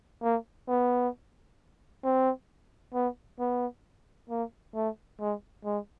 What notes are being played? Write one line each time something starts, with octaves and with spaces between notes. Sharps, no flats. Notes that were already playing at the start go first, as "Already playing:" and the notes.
A#3
B3
C4
B3
B3
A#3
A3
G#3
G#3